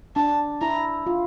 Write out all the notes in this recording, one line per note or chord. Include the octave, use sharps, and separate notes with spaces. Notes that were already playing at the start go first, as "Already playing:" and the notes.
D4 A5
E4 A#5
F4